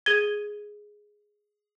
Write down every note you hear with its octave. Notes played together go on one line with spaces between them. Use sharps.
G#4 G#6 D#7 G7